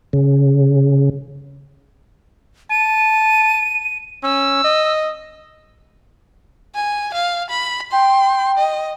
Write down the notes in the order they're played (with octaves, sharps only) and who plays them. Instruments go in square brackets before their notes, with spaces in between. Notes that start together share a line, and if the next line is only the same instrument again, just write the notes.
[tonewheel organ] C#3
[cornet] A5 [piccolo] D#7
[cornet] C#4 [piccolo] E6
[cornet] D#5
[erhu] G#5
F5
B5
[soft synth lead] G5 [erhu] C6
[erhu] D#5